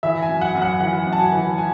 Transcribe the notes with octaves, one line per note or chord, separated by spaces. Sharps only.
E3 E5
G#5
F#2
F#5
F#2
F#5
E3 F#5
F#2
A5
G#5
E3
G#5